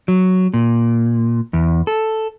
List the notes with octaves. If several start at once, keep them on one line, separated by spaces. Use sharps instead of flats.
F#3
A#2
E2
A4